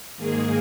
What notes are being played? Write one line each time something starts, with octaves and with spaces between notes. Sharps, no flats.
G#2 D#3 A#3 G#4